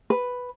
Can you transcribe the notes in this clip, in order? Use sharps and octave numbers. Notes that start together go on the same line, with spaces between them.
B4